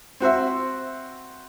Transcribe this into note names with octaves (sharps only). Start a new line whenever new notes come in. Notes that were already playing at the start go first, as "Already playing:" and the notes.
C4 F#4 C5 E5